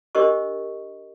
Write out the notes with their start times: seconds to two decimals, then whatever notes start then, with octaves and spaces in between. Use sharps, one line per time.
0.15 D4 G4 A#4 C5 D#5 C#6